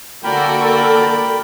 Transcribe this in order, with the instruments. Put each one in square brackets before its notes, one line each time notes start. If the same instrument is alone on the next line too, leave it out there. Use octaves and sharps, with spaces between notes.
[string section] D3 A#3 F#4 [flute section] A4 [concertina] A#4 B5 [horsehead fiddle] D5 G5